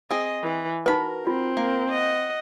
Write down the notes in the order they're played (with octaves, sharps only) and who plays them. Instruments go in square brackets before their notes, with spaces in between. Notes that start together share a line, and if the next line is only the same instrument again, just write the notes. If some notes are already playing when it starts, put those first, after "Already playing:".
[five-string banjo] C4 G#4 [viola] D#5
[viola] E3
[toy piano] D#4 B4 [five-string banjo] F#4 B5 [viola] A#4
[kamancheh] C4 [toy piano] F4
[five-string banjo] A#3 [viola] A#4
[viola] D#5 F#5